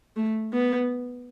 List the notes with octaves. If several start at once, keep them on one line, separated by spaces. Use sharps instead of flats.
A3
B3